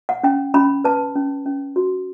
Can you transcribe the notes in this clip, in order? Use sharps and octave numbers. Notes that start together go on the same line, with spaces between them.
F#5
C#4 G5
C#4 B5
B4 A5
C#4
C#4
F#4